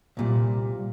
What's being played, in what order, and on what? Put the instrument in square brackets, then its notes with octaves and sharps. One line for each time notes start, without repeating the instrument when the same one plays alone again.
[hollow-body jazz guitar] C2 A#2 G3